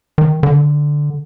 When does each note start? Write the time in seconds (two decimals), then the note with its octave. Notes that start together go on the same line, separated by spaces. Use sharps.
0.18 D#3
0.43 D3